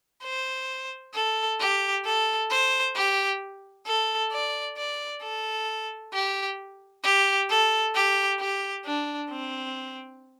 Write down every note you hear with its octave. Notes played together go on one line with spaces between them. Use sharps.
C5
A4
G4
A4
C5
G4
A4
D5
D5
A4
G4
G4
A4
G4
G4
D4
C4